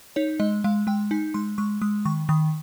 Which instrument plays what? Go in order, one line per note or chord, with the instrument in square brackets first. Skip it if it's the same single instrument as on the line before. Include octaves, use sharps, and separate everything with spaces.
[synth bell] D#4 C#5
G#3 D#5
G#3 F5
G#3 G5
D#4 G#5
G#3 C6
G#3 C#6
G#3 D#6
D#3 C#6
D#3 D#6